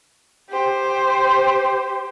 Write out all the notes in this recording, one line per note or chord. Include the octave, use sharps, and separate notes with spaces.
G4 C5